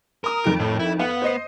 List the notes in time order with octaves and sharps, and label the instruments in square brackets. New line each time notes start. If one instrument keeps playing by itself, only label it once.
[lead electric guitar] A#4 [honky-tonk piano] A#5 D#6
[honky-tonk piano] F2 D#3 D7
[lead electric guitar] A2
E4
[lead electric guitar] B3 [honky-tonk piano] F5 F#5
[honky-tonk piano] C5 D#5 C7